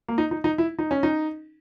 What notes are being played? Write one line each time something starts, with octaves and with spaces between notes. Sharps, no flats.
A#3
D#4
D#4
D#4
E4
D#4
C#4
D#4